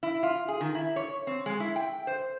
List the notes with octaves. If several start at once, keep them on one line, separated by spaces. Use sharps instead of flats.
E4
F4
G#4
D#3
E4
C#5
C4
G#3
E4
G5
C5